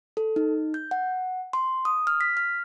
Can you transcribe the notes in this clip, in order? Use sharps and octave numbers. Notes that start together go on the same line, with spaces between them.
A4
D#4
G6
F#5
C6
D#6
F6
B6
F6